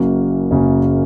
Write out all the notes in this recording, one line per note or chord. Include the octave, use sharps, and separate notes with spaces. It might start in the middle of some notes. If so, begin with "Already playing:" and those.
Already playing: F#1 F#2 C#3 A#3 F#4
F#1 F#2 C#3 A#3 F#4